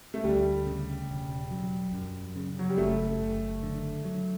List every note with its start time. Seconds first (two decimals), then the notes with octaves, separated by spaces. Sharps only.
0.14 A3
0.24 D2 G3
0.66 C#3
1.09 E1
1.51 F#3
1.93 F#2
2.36 C#3
2.59 F#3
2.69 G3
2.77 F#1 A3
3.21 F#1
3.63 D3
4.05 F#3